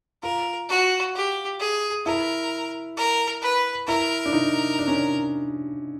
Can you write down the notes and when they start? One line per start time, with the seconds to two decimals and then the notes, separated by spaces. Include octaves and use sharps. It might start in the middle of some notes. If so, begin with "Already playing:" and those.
0.23 F4 A#4
0.70 F#4
1.15 G4
1.60 G#4
2.06 E4 A#4
2.97 A#4
3.42 B4
3.88 E4 A#4
4.26 D4
4.33 D#4
4.79 D4
4.88 C#4
4.95 D4